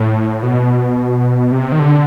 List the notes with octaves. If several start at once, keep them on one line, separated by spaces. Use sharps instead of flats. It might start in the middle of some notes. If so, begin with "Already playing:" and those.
Already playing: A2
B2
C3
D#3
D3